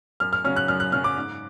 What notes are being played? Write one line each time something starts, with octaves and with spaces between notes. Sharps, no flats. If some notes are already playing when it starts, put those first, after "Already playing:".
F#2 F6
F6
C#3 F#3 C#4 F6
F#6
F#2 F6
F#6
C#3 F#3 C#4 F6
D6
G#2